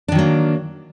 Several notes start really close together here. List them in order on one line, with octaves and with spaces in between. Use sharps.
D4 D#3 F#3 A#3